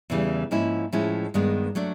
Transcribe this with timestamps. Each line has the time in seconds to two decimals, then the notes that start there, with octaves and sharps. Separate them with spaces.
0.10 E2 C#3 E3 G3
0.51 G#2 F3 A#3 C#4 E4
0.92 A2 F3 G#3 C#4 E4
1.34 G2 D#3 G#3 B3
1.75 F#3 A3 D4